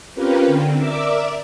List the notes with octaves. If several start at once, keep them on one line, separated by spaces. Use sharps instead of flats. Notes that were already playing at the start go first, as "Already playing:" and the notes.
C4 C#4 F4 G4 A#4 B4
D3 C4
A#4 D5 E5 D6 E6